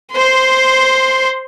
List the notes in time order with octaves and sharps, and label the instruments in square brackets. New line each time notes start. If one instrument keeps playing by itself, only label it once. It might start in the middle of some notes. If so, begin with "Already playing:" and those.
[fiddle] C5 C6